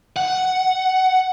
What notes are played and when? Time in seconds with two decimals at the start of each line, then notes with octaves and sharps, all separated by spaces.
0.16 F#5